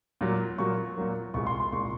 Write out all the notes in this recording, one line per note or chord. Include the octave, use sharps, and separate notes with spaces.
A#2 F#3 A#3
A#2 F#3 A#3 C#6
A#2 F#3 A#3
C2 A#2 G#3 C#6
C6
C6
C2 A#2 G#3 C#6